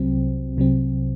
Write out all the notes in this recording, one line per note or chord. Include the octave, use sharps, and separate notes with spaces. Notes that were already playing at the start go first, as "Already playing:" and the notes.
Already playing: C2 C3 F#3 C4
C2 C3 F#3 C4